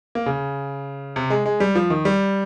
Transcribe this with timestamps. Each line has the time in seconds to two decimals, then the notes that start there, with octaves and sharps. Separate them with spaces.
0.15 A#3
0.26 C#3
1.16 C3
1.30 G#3
1.46 G#3
1.60 G3
1.75 F3
1.90 D#3
2.05 G3